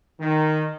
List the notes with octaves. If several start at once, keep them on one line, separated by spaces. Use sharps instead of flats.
D#3